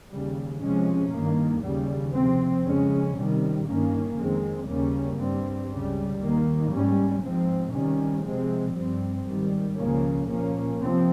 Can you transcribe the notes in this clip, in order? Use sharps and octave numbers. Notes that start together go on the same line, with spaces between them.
D#2 C#3 G3
C3 F3 G#3 C#4
G2 D#3 A#3
D#2 C#3 G3
C3 F3 C4
F2 C#3 G#3 C#4
C3 D#3 G3
G2 D#3 A#3 C#4
F2 D#3 G#3 C4
D#2 C#3 G3 A#3 C#4
G2 G3 C4
C#2 C#3 G3
D#2 D#3 A#3
G#2 G3 C#4
G#2 F3 C4
C3 D#3 G3 C#4
C3 F3 G#3 C4
G2 G3 C4
G#2 D#3 G3
C#2 C#3 F3 A#3 C#4
A#2 F3 A#3 C#4
C3 F3 C4